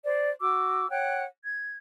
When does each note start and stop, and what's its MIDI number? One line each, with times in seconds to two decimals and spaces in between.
0.04 0.30 72
0.04 0.30 74
0.40 0.88 66
0.40 0.88 86
0.40 0.88 88
0.90 1.23 73
0.90 1.23 78
0.90 1.23 79
0.90 1.23 90
1.43 1.77 92